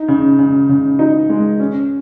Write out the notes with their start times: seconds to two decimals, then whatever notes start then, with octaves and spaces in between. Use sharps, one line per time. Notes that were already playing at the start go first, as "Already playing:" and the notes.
Already playing: D#4
0.08 C#3
0.39 C#3
0.69 C#3
0.99 D#4
1.30 G#3
1.60 C#4